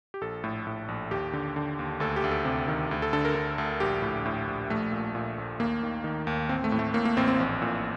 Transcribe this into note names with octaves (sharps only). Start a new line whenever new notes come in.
G4
A#1 A4
A2
A2
A#1
D#2 G4
D3
D3
D#2
D2 A4
G4
D2
A4
C3
D#3
D2
A4
D3 A4
A#4
D3
D2
A#1 G4
A2
A2
A#1
A#1 A3
A#2
A#2
A#1
D#2 A#3
D#3
D#3
D#2
A1 C4
A3
A2
A3
A2 A#3
A#3
A1 C4
C4
A#1
A#2